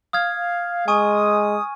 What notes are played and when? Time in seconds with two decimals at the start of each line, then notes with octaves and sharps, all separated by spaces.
0.13 F5 D#6 F6 G#6
0.88 G#3 G#5 C#6 D#6 D#7